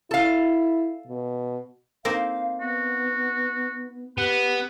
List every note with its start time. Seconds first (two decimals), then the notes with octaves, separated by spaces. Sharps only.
0.11 E4 A4 F5
1.07 B2
2.05 A#3 C4 D#4 F5
2.61 B3 F#4
4.18 B3 G4 B4